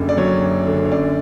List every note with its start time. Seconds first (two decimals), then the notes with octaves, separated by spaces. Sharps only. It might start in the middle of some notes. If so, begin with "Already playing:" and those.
Already playing: F#1 F#2 D3
0.09 D5
0.17 F#3 C#5
0.42 F#2
0.67 D3
0.86 C#5
0.91 F#2 D5